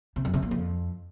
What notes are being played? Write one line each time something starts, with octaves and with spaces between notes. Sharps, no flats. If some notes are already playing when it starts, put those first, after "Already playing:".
C3
F#2
C3
A#2
F2